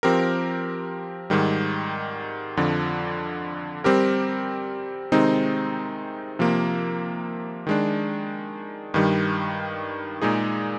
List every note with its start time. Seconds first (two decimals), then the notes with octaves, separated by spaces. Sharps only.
0.03 F3 C4 G4 A#4
1.30 G#2 D#3 G3
2.57 F2 D3 F3
3.84 G3 C4 G4 A#4
5.12 C3 D#3 G#3 C4 D#4
6.39 C3 F3 A#3
7.67 D#3 G#3 D4
8.94 G2 D#3 G3
10.22 A#2 G#3 D#4 G#4